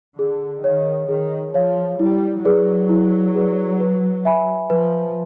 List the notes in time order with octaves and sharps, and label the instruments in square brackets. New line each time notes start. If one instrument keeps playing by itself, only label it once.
[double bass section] D3 [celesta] G#4
[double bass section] D#3 [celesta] C#5 F5
[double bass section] D#3 [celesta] G#4
[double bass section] F3 [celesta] C#5 F5
[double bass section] G3 [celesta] E4
[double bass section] F#3 [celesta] G#4 B4 D5
[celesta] E4
G#4 B4 D5
B4
E5 G#5 B5
[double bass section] F3 [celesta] B4